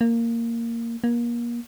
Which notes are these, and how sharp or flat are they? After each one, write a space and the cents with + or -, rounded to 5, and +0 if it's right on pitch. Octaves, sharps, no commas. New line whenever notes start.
A#3 -10
A#3 +30